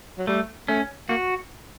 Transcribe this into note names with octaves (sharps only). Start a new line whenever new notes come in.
F#3
G3 A3
A3 C#4
A#3 F#4